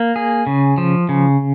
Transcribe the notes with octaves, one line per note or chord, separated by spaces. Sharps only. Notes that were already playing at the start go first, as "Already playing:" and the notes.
Already playing: A#3
G#4
C#3
F3
C#3